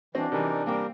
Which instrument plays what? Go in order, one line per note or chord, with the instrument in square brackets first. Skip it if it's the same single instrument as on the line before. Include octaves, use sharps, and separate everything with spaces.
[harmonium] E3 [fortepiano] C4 [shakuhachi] D4 [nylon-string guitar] F#4 D#5
[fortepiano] C3 E3 [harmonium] D#4 A#4 D5
[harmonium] G3 G4 A#4 [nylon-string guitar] A#3 C4 G5